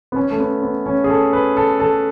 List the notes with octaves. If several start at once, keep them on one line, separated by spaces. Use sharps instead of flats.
B3
C#4
A3
B3
B3
C#4
G#4
A4
B4
A4
A4